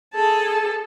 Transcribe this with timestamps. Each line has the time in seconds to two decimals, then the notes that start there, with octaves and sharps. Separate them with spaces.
0.15 G#4 A4 A5